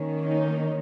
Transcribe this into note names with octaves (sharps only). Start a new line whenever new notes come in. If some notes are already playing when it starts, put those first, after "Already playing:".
Already playing: D#3 A#3 C#4
D#4